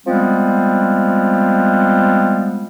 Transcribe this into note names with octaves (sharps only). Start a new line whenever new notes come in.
F3 G3 G#3 B3 C4